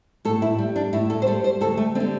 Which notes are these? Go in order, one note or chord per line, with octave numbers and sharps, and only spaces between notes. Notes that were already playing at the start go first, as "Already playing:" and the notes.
A2 A4
E4
G3
D4
A2 E4
A4
C5
G3 A4
C5
D2 A4
A3
D3 G3 C4